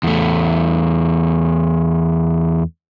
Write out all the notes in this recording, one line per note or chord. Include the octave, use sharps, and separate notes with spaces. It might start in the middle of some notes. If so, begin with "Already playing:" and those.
E2 A3